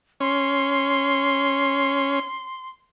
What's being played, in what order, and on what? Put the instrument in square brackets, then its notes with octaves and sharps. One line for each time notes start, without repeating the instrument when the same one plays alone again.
[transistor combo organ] C#4 [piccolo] C6